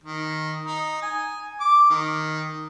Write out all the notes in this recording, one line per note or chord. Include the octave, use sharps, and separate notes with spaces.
D#3
D#4
G#5
D6
D#3